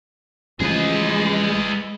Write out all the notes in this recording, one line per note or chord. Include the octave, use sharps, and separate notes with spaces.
A1 C#3 F3 G#3 G#4 B4